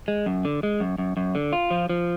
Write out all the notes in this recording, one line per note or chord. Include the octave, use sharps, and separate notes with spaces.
G#3
F#2
D3
G#3
F#2
F#2
F#2
D3
F4
F3
F3